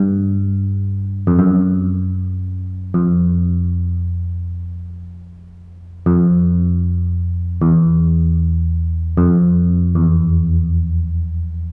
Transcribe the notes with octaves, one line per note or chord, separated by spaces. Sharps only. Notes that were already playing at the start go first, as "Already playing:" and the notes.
Already playing: G2
F2
F#2
F2
F2
E2
F2
E2